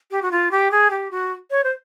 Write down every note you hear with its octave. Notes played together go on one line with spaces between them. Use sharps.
G4
F#4
F4
G4
G#4
G4
F#4
C#5
C5